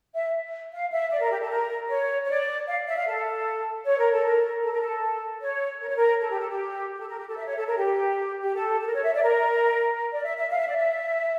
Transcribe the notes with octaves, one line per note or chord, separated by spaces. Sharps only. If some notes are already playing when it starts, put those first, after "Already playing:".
E5
F5
E5
D5
A#4
G4
A4
A#4
C#5
C#5
D5
F5
E5
F5
A4
C#5
A#4
A4
A#4
A4
A#4
A4
C#5
A#4
C#5
A#4
A4
G4
A4
G4
G4
A4
A#4
G4
A4
E5
C#5
A4
A#4
G4
G4
A4
A4
A#4
C#5
E5
D5
A#4
D5
E5
E5
F5
E5
D5
E5